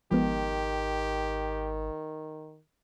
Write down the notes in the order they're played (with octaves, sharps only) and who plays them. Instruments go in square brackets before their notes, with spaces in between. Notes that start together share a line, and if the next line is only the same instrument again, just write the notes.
[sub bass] G#1 [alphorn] D#3 [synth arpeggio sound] F3 G#3 B3 [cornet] G4